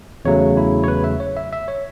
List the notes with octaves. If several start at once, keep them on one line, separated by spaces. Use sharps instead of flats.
E2 C#3 F#3 A3 C#5
E4
C#5
B4
E5
C#5
E5
E5
C#5